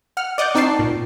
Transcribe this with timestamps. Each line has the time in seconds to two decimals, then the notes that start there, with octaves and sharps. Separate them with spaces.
0.17 F#5 F6
0.38 D5 D#5 F#5 D6 G6
0.55 C4 D#4 D5 A5 C#6 C7
0.79 A#2